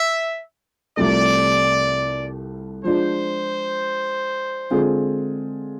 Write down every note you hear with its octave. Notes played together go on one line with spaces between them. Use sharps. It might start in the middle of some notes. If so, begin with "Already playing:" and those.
Already playing: E5
C2 C3 F3 A3 D5
F3 G#3 D4 F4 C5
D3 G#3 C4 F4 G#4